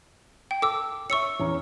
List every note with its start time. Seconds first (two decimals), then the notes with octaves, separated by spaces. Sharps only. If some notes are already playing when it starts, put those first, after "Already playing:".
0.51 G5
0.62 A4 D6 E6
1.10 C#5 E5 C#6 E6 C#7
1.40 E2 C#4 A#5